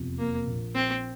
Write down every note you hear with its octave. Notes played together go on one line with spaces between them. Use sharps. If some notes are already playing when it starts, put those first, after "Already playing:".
Already playing: F1 E2 C3 F3
A#3
A#1 A#2 F3
C4